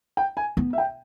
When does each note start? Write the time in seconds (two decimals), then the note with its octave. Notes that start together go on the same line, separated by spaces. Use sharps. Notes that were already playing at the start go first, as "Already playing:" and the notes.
0.17 G5
0.37 G#5
0.57 B3
0.73 E5
0.78 G5